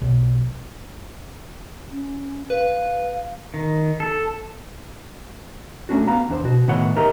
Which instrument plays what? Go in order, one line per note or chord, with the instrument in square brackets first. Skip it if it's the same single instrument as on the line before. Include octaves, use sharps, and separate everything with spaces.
[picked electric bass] B1
[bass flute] C#4
[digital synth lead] B4 [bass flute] F5
[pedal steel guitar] D#3
A4
[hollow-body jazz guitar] A3 C#4 D4 F#4
B3 F5 A#5
E2 D4 C5
B2 F#4
A2 D#3 B3 C#5 F#5
D#4 G4 A#4 D#5 E5 A#5